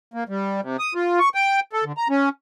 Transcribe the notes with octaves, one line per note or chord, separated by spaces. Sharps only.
A#3
G3
C3
D#6
F4
C#6
G5
A4
D3
A#5
C#4